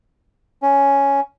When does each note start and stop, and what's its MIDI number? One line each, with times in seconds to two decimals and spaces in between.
0.62 1.20 61